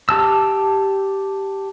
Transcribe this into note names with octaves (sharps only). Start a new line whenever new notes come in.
G4 A5 E6